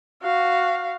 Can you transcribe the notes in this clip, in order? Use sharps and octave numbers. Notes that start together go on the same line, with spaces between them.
F#4 F5